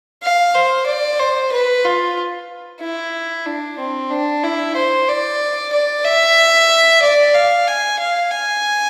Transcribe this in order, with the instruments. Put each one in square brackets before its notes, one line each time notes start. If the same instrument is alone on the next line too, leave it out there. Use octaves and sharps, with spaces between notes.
[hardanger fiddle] F5
C5
D5
C5
B4
F4
E4
D4
C4
D4
E4
C5
D5
D5
E5
D5
F5
G#5
F5
G#5